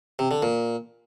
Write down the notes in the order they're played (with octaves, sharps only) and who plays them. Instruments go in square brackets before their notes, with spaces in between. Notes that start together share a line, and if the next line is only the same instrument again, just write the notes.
[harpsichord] C3
D3
A#2